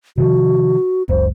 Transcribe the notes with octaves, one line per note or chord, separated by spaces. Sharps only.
C3 D#3 F3 F#4
F#1 C#2 C5